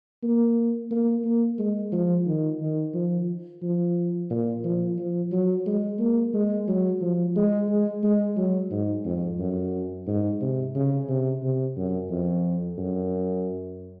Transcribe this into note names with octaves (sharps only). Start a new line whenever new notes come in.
A#3
A#3
A#3
G#3
F3
D#3
D#3
F3
F3
A#2
F3
F3
F#3
G#3
A#3
G#3
F#3
F3
G#3
G#3
G#3
F#3
G#2
F2
F#2
G#2
C3
C#3
C3
C3
F#2
F2
F#2